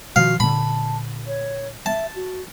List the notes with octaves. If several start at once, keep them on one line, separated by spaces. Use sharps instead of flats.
B2 D#3 F3 F#4 F5
A#2 D3 A5 B5
C#5
E5 A5
F#4